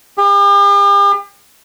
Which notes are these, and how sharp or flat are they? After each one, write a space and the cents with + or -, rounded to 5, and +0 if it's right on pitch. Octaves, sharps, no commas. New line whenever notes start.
G4 +45